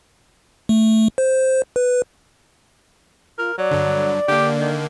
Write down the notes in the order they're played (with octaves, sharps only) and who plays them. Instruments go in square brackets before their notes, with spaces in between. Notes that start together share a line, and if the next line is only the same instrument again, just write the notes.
[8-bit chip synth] A3
C5
B4
[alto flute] F4 [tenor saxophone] A#4
[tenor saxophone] F#3 [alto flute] D5
[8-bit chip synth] G2 D3
[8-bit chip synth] D3 A#3 [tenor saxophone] G4
[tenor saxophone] D#3